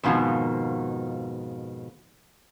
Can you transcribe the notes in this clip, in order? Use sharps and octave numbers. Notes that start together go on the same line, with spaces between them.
F2 G#2 B2 D#3 F3